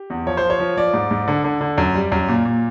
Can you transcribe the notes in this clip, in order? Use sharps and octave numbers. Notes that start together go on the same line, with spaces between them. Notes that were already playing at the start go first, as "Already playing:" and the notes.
Already playing: G4
E2
F3 C#5
C5
F3
C#5
F3
F3 D5
G#2
G#2
D3
D3
D3
F#2
G3
F#2
A#2
A#2